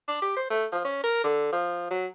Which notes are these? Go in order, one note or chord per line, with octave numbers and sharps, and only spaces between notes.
D4
G4
C5
A3
F3
C#4
A#4
D3
F3
F#3